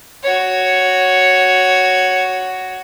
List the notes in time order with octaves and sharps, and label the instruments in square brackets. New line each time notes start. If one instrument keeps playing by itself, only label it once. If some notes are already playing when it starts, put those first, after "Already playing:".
[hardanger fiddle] F#4 C#5